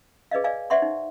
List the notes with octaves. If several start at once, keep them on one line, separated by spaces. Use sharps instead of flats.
G#4 B4 D5 D#5 F5
B4 D5 D#5 F5 G#5
C5 D5 E5 F#5 C6 C#6
D#4